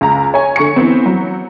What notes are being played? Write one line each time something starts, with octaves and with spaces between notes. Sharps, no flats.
C#2 A#5
C#5 G#5
D3 C#6 C#7
E3 B3 C4
F#3